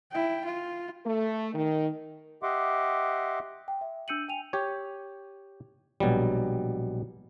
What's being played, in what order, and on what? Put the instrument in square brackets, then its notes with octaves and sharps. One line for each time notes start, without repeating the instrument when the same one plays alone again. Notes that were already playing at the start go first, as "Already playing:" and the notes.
[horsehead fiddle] E4 G5
F4
[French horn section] A3
D#3
[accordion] G4 D#5 E5 F#5 C6 D6
[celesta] G5
E5
D4 E6 G6 C#7 D#7 F#7
G5 G#5 D#7 F7
[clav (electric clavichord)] G4 C#5
A#1 B2 F#3 G3